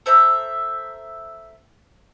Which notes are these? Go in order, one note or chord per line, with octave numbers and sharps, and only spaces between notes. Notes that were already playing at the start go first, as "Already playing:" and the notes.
A4 C5 E5 A#5